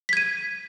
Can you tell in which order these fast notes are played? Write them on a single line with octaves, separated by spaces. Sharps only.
B6 G#6 D#7